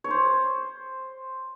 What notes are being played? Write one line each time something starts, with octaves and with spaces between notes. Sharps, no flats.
C#5
C5